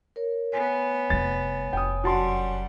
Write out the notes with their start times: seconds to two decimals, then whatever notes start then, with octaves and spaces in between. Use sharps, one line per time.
0.16 A#4 C#5
0.52 B3 C#5 G#5
1.10 F1 G3 A6
1.73 F1 G5 D#6
2.04 F#2 G3 F#4 F#5 A5 C6